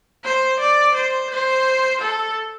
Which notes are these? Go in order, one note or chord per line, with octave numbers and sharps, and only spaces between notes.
C5
D5
C5
C5
A4